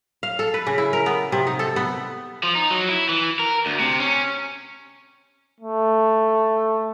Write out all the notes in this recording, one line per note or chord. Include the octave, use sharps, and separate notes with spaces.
F5
A4
B4
C#3
E4
A#4
B3
C3
D#4
A4
B3
F3
D#4
F#3
E4
E3
A#4
D2
C3
C#4
A3